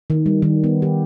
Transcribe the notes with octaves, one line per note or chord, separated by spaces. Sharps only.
D#3
G3
D#3
B3
G4